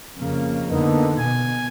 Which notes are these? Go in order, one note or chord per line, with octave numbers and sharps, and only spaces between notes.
F2 C#3 A#3
D3 A#3 B3 D#4
B2 G#5